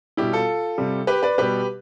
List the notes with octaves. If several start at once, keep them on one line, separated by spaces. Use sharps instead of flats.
B2 G3 E4 G4
F4 A4
C3 G3
G4 B4
B4 D5
B2 G3 G4 B4